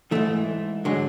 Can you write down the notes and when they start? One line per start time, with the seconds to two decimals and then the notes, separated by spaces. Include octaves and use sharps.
0.11 G#2 E3 A3
0.85 D3 F#3 G#3